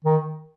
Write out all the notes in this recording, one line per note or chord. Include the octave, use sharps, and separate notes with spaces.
D#3